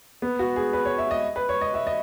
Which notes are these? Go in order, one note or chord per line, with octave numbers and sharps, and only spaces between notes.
B3
F#4
G#4
B4
C#5
E5
D#5
B4
C#5
D#5
E5
D#5